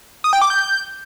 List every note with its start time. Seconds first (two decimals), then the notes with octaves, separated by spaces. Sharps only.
0.24 D#6
0.33 G5
0.42 D6
0.50 G6